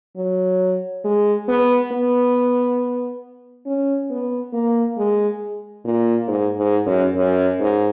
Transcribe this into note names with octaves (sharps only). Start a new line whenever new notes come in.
F#3
G#3
B3
B3
C#4
B3
A#3
G#3
A#2
G#2
G#2
F#2
F#2
G#2